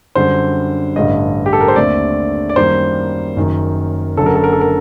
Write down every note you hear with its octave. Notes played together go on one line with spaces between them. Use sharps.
F#2 D3 G3 C5
A1 G2 D3 G3 D#5
G4
A4
A#4
C5
D#2 D3 A3 C4 D5
D5
F#2 D#3 G3 A#3 C5
F#1 F#2 D#3
F#1 F#2 D3 F#3 A4
A#4
A4
A#4
A4
A#4